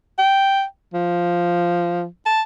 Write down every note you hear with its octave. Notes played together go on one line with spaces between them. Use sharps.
G5
F3
A5